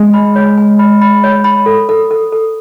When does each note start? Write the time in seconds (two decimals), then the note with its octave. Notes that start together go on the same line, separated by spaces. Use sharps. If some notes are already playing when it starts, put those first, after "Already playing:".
Already playing: G#3 G#5
0.14 B5
0.36 C#5
0.57 G#5
0.79 B5
1.01 B5
1.24 C#5
1.44 B5
1.66 A4
1.89 A4
2.11 A4
2.32 A4